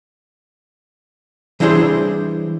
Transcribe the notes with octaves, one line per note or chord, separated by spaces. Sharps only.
E3 G3 D4 E4 G#4 C5